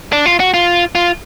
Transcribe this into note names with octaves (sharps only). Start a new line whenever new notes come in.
D4
F4
F#4
F4
F4